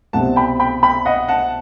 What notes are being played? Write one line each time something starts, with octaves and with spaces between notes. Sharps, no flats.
C2 B2 G3 C4 F#5 A5
G5 B5
G5 B5
G5 B5
D#5 F#5
F#5 A5